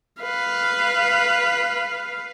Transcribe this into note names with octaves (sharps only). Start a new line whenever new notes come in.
B4 F5